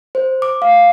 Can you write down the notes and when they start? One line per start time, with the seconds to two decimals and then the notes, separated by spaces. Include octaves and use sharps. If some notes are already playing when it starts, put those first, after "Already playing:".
0.15 C5
0.42 D6
0.62 F5